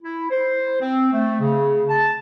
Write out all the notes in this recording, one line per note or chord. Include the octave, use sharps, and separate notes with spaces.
E4
C5
C4
A3
C#3
A5